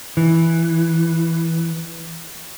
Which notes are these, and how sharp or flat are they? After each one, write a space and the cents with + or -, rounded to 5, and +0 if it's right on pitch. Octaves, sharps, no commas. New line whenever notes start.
E3 +0